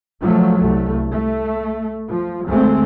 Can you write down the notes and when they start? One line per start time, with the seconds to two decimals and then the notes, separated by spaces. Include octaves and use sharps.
0.21 F3 F#3 A3
0.59 C2 A3
1.11 A3
2.09 F3
2.47 D2 G#3 A3 C4